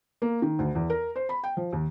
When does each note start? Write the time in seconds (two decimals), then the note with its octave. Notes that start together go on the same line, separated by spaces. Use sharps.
0.22 A#3
0.42 D#3
0.59 D2
0.75 E2
0.90 A#4
1.16 C5
1.29 B5
1.44 G5
1.57 F3
1.73 D#2